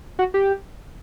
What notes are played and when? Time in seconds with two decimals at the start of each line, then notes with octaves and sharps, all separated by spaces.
0.19 F#4
0.34 G4